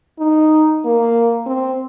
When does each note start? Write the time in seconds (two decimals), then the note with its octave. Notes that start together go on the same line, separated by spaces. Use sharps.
0.19 D#4
0.85 A#3
1.46 C4